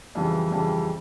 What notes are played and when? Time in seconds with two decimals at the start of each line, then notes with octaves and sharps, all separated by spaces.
0.15 F2 C#3 E3 G3
0.51 F2 C#3 E3 G3